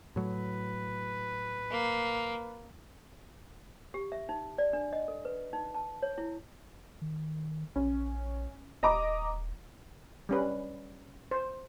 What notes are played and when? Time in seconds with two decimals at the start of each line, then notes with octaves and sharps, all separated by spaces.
0.16 A2 F#3 B4
1.71 A#3
3.94 G4
4.12 E5
4.29 D#4
4.58 D5
4.73 D4
4.93 D#5
5.08 A4
5.25 B4
5.53 D#4
5.75 A5
6.02 C#5
6.18 E4
7.02 D#3
7.76 A#1 C#4
8.83 D#1 D#5 A#5 D6
10.29 G3 C#4 B4
11.31 C5